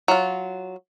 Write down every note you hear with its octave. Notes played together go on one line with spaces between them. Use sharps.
F#3 F4